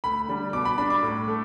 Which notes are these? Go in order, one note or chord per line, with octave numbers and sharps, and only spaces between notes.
D2 B5
D3 G3
B2 D6
B5
G3 D4 B5
D6
A2
A3